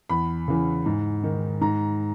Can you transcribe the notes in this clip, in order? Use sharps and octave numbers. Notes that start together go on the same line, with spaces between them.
E2 B5
C#3 E3
G#2
D#3
G#2 A#5